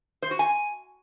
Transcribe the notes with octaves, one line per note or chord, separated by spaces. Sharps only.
C5
F#4
G#5